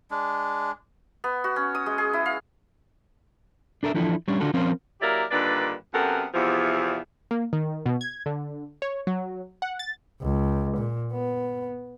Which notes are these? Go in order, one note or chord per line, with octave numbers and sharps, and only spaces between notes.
G#3 D4
B3
F#4
C#4
D#6
G#3
G#4
E4
F5
D4 A4 A#4 E5
E3 F3 D4 E4 A4
G3 C#4 D4 C#5
D3 D4 F4 F#4 A4
F3 C4 C#4 F4 A#4 C5
F#3 A#3 E4 G4 A#4 D5
G2 A#2 D3 D#3 B4 D5
F#2 C3 B3 A4 A#4 F#5
E2 C3 F3
A#3
D#3
B2
G#6
D3
C#5
F#3
F#5
A6
C#2
A#2
B3